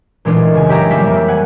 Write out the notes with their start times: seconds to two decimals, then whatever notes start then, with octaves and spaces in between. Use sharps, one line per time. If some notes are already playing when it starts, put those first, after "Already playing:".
0.25 A#2 E3 G#3 A3 D4 F4
0.54 F#1 C#3 G#4 G#5
0.69 G4 C#5 E5 G5 A5 A#5
0.90 G3 A3 A#3 F4 E5
1.05 F2
1.28 F#5 G#5